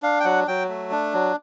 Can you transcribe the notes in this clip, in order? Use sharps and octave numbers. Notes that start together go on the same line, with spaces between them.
D4 F5
G5
F#3 F#5
F#3 G5
A3
D4
F#3